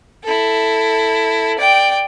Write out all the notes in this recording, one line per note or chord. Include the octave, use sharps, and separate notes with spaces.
E4 A4
D5 G5